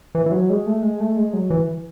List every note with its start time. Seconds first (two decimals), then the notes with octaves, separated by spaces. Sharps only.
0.15 E3
0.26 E3
0.32 F#3
0.49 G#3
0.66 A3
0.82 G#3
1.00 A3
1.17 G#3
1.33 F#3
1.50 E3